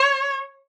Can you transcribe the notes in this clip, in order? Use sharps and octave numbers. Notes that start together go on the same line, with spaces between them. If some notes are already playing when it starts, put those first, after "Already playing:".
Already playing: C#5